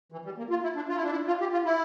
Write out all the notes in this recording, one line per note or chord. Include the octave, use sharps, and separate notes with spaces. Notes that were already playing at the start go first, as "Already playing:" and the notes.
E3
G3
A#3
F4
E4
D4
F4
E4
D4
E4
F4
G4
F4
E4